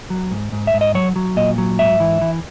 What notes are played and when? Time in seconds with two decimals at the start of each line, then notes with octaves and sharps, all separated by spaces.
0.10 F#3
0.31 G#2
0.52 G#2
0.67 E5
0.74 G#2
0.81 D#5
0.95 F#3 C#5
1.16 F#3
1.36 A#2 D#5
1.58 F#3
1.79 G#2 E5
2.00 E3
2.21 E3